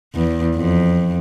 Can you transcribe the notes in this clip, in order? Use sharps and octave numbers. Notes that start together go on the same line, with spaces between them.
E2
F2